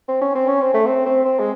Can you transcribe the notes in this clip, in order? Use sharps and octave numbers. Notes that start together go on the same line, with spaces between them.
C4
C#4
C4
C#4
C4
A3
C4
C4
C4
G#3